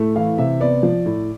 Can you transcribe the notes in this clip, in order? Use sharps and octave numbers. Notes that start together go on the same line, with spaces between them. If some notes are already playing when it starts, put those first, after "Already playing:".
Already playing: A2 A3
E3 F5
C3 E5
B3 D5
F3
A2